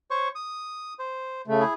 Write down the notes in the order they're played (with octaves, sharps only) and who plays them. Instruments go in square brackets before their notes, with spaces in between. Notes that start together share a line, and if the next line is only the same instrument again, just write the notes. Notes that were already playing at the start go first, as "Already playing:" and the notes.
[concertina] C5 C#5 C#6
D#6
C5
[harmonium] C#3 A3
[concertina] E4 G#4